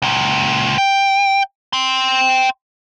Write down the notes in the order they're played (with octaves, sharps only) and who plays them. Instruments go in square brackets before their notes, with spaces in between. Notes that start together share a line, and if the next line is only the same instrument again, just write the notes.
[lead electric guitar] C#2 A#2
G5
G5 C6